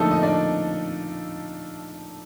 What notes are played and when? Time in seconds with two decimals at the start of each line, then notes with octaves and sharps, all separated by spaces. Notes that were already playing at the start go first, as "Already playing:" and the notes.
Already playing: D3 F3 A3 A#3 D#4 A4
0.11 D#5
0.22 D4 D5